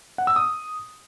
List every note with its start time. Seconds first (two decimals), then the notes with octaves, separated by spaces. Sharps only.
0.18 F#5
0.27 E6
0.36 D#6